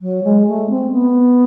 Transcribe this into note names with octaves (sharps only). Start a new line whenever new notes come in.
F#3
G#3
A3
C4
B3